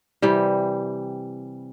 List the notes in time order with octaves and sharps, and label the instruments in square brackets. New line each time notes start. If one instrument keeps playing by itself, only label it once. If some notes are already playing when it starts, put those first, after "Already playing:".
[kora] C3 E3 G3